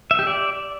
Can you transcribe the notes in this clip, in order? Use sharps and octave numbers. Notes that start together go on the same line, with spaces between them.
E5
G4
D5